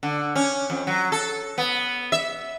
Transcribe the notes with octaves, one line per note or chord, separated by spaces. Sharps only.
D3
C#4
F2
F#3
A4
B3
E5